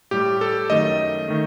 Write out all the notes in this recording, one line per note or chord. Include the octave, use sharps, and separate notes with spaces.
A2 G3 G4
A4
F#2 D#3 A3 D#5
D#3 A3